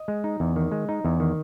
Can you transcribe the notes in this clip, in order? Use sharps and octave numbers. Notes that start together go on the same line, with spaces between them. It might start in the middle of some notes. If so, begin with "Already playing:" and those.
Already playing: D#5
G#3
D#4
E2
D#3
G#3
D#4
E2
D#3